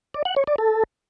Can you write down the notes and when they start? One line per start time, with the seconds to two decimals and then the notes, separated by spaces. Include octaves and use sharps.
0.14 D5
0.25 F#5
0.36 C#5
0.47 D5
0.58 A4